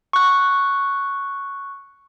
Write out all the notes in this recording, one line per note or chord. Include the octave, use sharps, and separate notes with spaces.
C#6 F#6